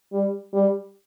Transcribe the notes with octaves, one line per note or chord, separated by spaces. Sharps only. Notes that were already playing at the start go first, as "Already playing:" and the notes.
G3
G3